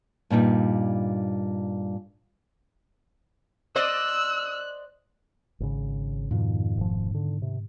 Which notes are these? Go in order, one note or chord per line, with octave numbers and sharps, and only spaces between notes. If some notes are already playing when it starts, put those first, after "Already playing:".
G2 A#2 G3 D#4
C5 D5 D#5 E6 F#6
G#1 C#3
F2 G#2 B2 D#3
F1 F3
D3
C3